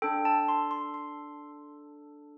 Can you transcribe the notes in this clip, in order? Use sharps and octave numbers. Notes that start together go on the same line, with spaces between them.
D4 A4 G5
A5
C6
C6
C6